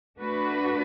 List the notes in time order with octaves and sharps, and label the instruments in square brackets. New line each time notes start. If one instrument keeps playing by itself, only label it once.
[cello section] A3 D4 F#4 B4